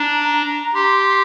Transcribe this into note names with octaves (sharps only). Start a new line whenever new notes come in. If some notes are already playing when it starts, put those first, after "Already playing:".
Already playing: D4 A#5
G4 C6